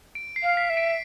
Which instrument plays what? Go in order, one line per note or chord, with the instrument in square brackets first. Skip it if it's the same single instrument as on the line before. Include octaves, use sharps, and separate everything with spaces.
[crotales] D7
C7
[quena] F5
[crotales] B6
[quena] E5
[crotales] D7